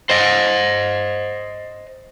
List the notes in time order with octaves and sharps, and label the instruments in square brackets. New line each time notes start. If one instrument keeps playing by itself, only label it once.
[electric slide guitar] C5 D#5